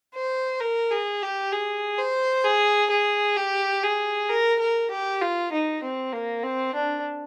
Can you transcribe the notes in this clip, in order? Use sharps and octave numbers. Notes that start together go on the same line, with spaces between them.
C5
A#4
G#4
G4
G#4
C5
G#4
G#4
G4
G#4
A#4
A#4
G4
F4
D#4
C4
A#3
C4
D4